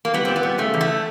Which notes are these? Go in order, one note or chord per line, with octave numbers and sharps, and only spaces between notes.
A#3
G3 B3
A#2 C4
B3
G3
C#3 A3
E2
A3